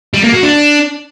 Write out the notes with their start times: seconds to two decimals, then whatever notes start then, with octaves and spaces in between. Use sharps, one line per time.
0.14 G3
0.23 A#3
0.33 F#4
0.42 D4